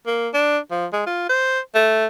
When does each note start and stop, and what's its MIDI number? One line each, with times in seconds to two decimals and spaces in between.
0.07 0.29 58
0.34 0.58 62
0.71 0.86 53
0.93 1.02 56
1.07 1.28 65
1.29 1.60 72
1.75 2.06 57